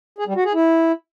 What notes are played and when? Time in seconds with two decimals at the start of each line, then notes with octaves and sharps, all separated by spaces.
0.18 G#4
0.27 G3
0.36 F#4
0.45 G#4
0.54 E4